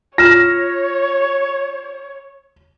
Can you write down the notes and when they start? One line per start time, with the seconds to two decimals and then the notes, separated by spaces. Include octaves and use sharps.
0.18 F4 C#5 F6 A#6 E7